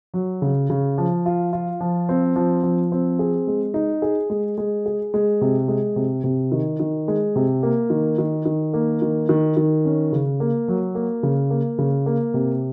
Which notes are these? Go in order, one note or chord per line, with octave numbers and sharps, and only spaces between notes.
F#3
C#3
C#3
F3
F4
F4
F3
C4
F3
F3
C4
G#4
G#3
D#4
G#4
G#3
G#3
G#4
G#3
C3
G#3
C3
C3
D#3
D#3
G#3
C3
A#3
D#3
D#3
D#3
A#3
D#3
D#3
D#3
C#4
C#3
A#3
F#3
A#3
C#3
A#3
C#3
A#3
C3